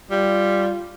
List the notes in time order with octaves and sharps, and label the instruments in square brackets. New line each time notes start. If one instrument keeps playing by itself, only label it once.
[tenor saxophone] G3 [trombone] F4